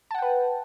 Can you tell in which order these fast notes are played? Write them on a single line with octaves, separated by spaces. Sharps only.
A5 F#5 G5 B4